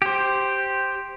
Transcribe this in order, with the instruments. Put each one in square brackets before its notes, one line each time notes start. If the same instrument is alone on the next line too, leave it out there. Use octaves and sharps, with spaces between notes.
[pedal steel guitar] G4 C5